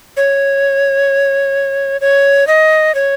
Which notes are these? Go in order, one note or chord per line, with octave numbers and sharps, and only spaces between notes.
C#5
C#5
D#5
C#5